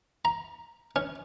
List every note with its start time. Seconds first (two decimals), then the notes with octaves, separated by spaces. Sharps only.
0.25 A#5
0.96 C#4